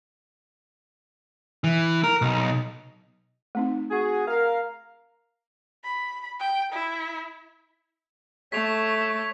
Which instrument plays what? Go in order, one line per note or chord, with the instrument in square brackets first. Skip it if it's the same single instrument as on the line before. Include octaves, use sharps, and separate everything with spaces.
[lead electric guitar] E3
A#4
B1
[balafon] A3 C4 D#4
[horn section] F#4 G#4
A#4 F5
[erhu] B5
G5
E4
[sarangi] A3 [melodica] C#5 [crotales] B6 F7